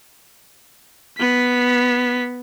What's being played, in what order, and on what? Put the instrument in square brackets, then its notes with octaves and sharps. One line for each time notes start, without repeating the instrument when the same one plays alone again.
[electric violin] B3 B6